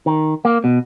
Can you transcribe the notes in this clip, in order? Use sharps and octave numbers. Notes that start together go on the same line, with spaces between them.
D#3
A#3
B2